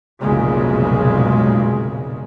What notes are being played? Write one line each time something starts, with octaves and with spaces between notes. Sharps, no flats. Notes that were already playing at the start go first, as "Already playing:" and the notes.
F1 B1 A#2 C#3 G#3